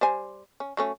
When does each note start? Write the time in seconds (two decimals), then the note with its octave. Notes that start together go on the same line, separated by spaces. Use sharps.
0.01 G3 C5 G#5
0.60 C#4
0.77 F#3 A3 C#4